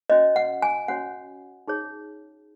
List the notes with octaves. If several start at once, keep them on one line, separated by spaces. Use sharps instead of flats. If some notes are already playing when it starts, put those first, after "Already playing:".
C#4 F#4 C#5 D#5
F#5
G#5
C#4 F#4 C#5 F#5
D#4 G#4 C#5